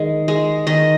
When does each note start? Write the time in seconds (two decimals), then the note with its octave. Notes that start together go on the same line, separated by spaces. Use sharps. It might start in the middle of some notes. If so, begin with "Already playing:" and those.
Already playing: D#3 G#3
0.28 G#3
0.67 D#3 D#5